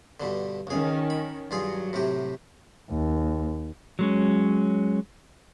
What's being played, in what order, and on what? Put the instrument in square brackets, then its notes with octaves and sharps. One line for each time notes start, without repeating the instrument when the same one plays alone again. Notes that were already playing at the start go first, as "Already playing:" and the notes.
[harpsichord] G2 B2 D3
[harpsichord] C#2 G#4 [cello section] D#3 C#4
[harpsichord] B5
[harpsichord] G2 F4 G#4 [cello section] F#3
[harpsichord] A2 C3 G4
[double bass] D#2
[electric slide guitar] F#3 G#3 C#4